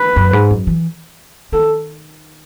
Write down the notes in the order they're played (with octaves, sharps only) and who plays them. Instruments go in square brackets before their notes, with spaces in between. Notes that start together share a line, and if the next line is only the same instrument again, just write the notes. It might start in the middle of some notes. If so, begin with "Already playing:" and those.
Already playing: [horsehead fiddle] B4
[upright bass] F#2
G#2
F#2
E3
[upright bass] D#3 [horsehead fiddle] A4